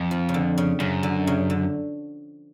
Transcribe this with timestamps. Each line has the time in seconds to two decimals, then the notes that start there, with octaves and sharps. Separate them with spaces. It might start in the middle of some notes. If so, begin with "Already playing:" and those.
Already playing: F2
0.11 F3
0.29 C#3
0.34 D3
0.58 C#3
0.80 F#2 C#3
1.03 D3
1.27 C#3
1.50 D3